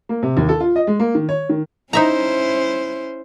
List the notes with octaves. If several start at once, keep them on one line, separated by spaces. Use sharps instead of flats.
A#3
C3
D#2
A4
F4
D#5
G#3
A#3
D#3
C#5
D#3
C#4 D#4 E4 C5 E5 A#5